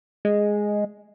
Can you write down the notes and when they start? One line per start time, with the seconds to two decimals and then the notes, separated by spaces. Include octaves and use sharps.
0.25 G#3